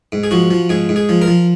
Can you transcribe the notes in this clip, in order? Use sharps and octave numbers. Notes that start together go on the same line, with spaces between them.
G#2
G#4
F3 F#4
F3
G#2 G#4
G#2
G#4
F3
A#4
F3